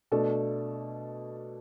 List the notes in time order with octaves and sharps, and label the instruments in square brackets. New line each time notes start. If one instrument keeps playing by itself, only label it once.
[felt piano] B2 A3 D4 A4